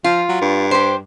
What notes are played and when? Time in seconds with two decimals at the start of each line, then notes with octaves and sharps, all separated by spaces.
0.04 F3 F4
0.29 F#3
0.41 G2
0.71 G4 C5